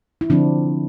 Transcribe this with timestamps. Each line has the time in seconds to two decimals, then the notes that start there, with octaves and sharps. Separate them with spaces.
0.21 E4
0.30 D3 F3 C4 D4